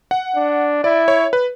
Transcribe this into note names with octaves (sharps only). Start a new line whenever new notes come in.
F#5
D4
E4 D5
C#5
B4